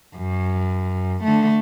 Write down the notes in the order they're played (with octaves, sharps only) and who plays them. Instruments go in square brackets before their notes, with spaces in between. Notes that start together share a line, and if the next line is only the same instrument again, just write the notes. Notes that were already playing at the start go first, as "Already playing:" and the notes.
[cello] F#2
D3 A3